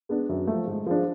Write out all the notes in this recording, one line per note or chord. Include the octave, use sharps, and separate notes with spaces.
G#3 B3 D4
F#2
F3 A3
G#2
F3 G#3 D4